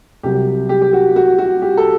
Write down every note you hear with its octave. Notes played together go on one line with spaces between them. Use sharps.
C2 C3 F#3 G4
G4
G4
F#4
F#4
F#4
G4
A4